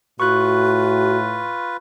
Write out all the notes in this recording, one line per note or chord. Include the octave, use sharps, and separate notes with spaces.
A2 F4 F#4 B4 C#6 F#6